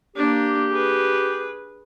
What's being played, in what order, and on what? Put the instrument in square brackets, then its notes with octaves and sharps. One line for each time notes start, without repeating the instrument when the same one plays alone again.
[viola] A#3 D4 [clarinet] G4
[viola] G#4 B4